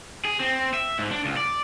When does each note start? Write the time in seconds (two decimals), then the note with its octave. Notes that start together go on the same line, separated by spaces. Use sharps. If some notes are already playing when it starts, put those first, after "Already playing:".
0.25 G#4
0.40 C4
0.74 E5
0.99 G#2
1.11 D4
1.25 C#2
1.37 D5